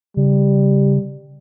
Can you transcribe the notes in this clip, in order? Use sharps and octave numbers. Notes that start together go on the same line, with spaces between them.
C#3 G3